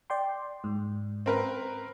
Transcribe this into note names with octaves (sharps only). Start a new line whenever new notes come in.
D5 G5 C6
G#2
C4 A#4 B4